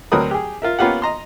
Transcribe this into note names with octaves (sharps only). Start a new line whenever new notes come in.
D2 F#3 C4 A#4 B4 D#6
G4 G#4
F4 A#4 E5
A#3 B3 C#4 F4 G4 F#5
D#5 A#5 C6